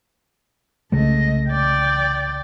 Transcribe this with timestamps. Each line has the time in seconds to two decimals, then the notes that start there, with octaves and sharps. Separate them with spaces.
0.92 C2 C#3 G#3 A3 D#5
1.49 D5 G5